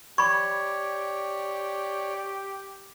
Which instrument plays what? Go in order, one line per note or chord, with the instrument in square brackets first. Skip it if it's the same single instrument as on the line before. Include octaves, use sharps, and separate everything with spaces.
[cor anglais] G4 [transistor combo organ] C#5 D5 [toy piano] B5 C#6 [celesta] G#6